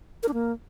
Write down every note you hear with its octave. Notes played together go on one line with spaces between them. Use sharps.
A#4
D4
A#3